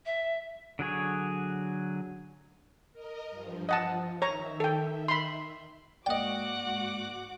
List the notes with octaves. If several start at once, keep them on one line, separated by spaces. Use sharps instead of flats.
E5
D3 F#3 G#4 C#5
A#4 D#5
G2 F3
F3 D#5 F#5 A5
D#3 C#5 E5 A#5
A4 G5
B5 C6
G#2 A#3 F#4 D5 D#5 F#5 G5 D6